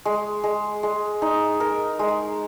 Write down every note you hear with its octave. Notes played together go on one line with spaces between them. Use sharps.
G#3
G#3
G#3
D#4
A#4
G#3